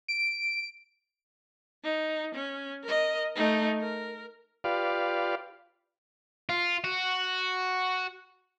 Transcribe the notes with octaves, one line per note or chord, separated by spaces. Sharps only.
D7
D#4
C#4
A#4 D#5
A3 D#4
A#4
F4 G4 B4 D5 F5
F4
F#4